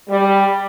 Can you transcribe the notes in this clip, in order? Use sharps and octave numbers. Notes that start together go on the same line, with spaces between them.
G3